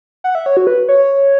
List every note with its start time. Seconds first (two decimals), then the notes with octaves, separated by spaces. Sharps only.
0.24 F#5
0.35 E5
0.46 C#5
0.57 F#4
0.67 B4
0.89 C#5